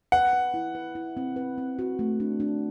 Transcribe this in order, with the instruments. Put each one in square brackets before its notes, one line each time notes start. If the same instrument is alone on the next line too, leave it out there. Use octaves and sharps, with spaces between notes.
[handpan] B4 [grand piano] F#5
[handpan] B4
E4
B4
E4
C4
B4
C4
F#4
A3
D4
D4